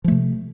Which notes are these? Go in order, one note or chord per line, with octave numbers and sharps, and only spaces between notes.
C3 F3 A3